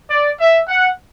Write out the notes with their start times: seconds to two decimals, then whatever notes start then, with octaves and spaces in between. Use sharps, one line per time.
0.10 D5
0.39 E5
0.68 F#5